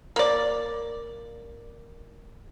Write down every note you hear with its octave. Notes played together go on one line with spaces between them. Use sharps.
A#3 D5